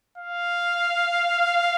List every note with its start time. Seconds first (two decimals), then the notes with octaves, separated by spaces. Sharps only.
0.18 F5